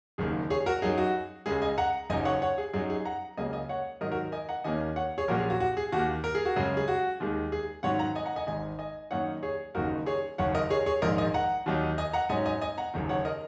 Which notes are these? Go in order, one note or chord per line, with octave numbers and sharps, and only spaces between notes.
F#1 F#2 D#3 A#3 G#4
G#4 C#5
F#4 A#4
F#2 F#3 D#4 G#4
F#4
C#2 C#3 G#3 G#4
D#5 G#5
F#5 A#5
F#1 F#2 F#3 D#4 D#5 G#5
C#5 F#5
C#5 F#5
G#4
F#2 F#3 D#4 G#4
G#4
F#5 A#5
C#2 C#3 F#3 A#3 D#5 G#5
D#5 G#5
C#5 F#5
G#2 D#3 F#3 D#4 A#4 D#5
F#4 A#4
D#5 G#5
F#5 A#5
D#2 D#3 A#3 C#4 D#5 G#5
C#5 F#5
G#4 C#5
A#1 A#2 F#3 C#4 F#4 A#4
G#4
F#4
F#4
G#4
D#2 D#3 A#3 F#4
A#4
G#4
F#4
F#2 C#3 G#3 C#4 G#4
G#4
F#4
D#2 D#3 G#3
G#4
G#2 D#3 F#3 C#4 C#5 F#5
F#5 A#5
D#5 G#5
F#5 A#5
D#5 G#5
G#1 G#2 D#3 D#5 G#5
D#5 G#5
F#2 D#3 A#3 D#4 C#5 F#5
G#4 C#5
F#1 F#2 D#3 A#3 D#4 F#4 A#4
G#4 C#5
F#1 F#2 D#3 C#5 F#5
A#4 D#5
G#4 C#5
G#4 C#5
A#1 G#2 D#3 A#4 D#5
D#5 G#5
F#5 A#5
D#2 D#3 F#3 D#4
D#5 G#5
F#5 A#5
G#2 F#3 C#4 D#5 G#5
D#5 G#5
D#5 G#5
F#5 A#5
F#1 F#2 D#3
C#5 F#5
A#4 D#5